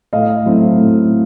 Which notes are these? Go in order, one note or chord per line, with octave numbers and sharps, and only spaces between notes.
A2 D#5 F5
F#3 A3 C4 E4
A2